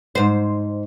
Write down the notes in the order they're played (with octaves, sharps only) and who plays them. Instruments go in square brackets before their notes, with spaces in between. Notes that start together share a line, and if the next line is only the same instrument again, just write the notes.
[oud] G#2 C5